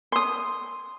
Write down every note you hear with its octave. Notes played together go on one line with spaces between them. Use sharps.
C6 D#6